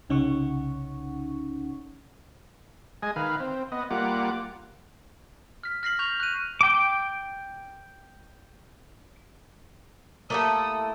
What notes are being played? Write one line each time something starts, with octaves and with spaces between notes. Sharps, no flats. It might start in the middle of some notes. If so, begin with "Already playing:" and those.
C2 C#3 C#4 D#4 F#5 C#6
G#3 D#5 G#5
D#3 B4 F5
C4
B3 D#5
G3 A#3 F4 F#5 D6
F6 B6
F6 A#6 C7 F#7
C#6 G6 F7
F#6 D#7
G5 D6
A3 A#3 E4 G4 A4 A#4 D#6